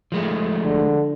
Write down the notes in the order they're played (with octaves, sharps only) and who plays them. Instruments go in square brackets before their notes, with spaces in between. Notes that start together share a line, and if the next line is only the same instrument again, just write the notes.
[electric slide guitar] F3 G#3 A3
[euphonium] D3